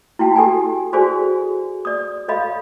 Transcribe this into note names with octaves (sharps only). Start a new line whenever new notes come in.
E4 F#4 G5 A5
G4 A4 G5 G#5
F#4 G#4 A4 C5 D5 G#5
D5 D#6
A4 C#5 D#5 F5 B5